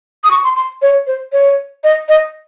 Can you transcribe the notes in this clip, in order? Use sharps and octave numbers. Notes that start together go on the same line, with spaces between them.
D#6
C#6
C6
C6
C#5
C5
C#5
D#5
D#5